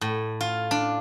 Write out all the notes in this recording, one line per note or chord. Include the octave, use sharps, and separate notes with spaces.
A2
F4
D4